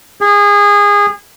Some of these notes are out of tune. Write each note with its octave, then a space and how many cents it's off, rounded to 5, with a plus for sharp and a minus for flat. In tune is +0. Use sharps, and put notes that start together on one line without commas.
G#4 -25